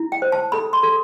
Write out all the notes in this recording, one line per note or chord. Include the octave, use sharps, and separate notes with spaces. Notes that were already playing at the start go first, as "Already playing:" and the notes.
Already playing: E4
G5
C5
A5
A4 B5
C6
A4